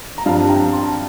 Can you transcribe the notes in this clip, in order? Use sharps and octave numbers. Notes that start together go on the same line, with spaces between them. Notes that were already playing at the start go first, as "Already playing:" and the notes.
A#5
G2 F3 C4 F5 A5
G5 A#5
A5 C6